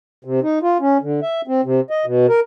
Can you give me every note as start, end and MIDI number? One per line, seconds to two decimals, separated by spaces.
0.25 0.40 48
0.43 0.59 63
0.62 0.78 65
0.80 0.98 61
1.01 1.20 50
1.22 1.41 76
1.47 1.61 60
1.64 1.81 48
1.90 2.05 75
2.06 2.26 47
2.28 2.40 70